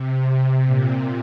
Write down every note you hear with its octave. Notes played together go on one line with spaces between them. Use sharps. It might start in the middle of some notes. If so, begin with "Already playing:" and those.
Already playing: C3
C3
A#2